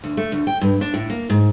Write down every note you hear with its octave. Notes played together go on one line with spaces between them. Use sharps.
D2
A3
D2
G5
G2
D4
A2
A#3
G#2